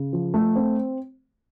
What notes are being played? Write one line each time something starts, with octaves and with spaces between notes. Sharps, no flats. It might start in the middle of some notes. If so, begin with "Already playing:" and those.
Already playing: C#3
F3
A3
C4